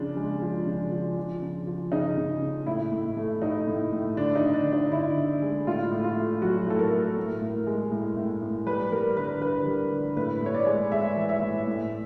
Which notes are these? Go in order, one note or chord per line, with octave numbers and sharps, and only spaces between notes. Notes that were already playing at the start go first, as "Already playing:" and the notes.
Already playing: C#3 F3 D4
G#3
F3
C#3
F3
F3
C#3
F3
C#3 D#4
C#3
C#3
A2 E4
A2
A3
A3 D#4
A2
A2
D3 D4
D#4
D3
D4
D3
D#4
D3 E4
D3
G#3
A2 F4
A2
F4
A3
F#3 F#4
A2 A4
A#4
A3
A2
A2
G#3
A2
A2
A2
G3 B4
G3 A#4
D3 B4
D3 B4
G3
D3
A2 B4
A2 C#5
D5
G#3
G#3 E5
E3
E5
A2
A2